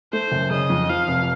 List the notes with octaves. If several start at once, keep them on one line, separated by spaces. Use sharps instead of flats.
A3 C5
F#1
C#3 D#5
F2
F3 F5
F1